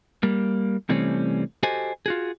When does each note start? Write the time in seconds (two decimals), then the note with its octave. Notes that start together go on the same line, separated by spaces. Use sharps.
0.23 G3 A#3
0.89 C3 E3 G3 A3 C4 C#4
1.63 F#4 G4 A4 C5 D#5 G#5
2.06 F4 F#4 G#4